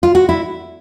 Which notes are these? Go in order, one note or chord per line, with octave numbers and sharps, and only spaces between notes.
F4
F#4
E4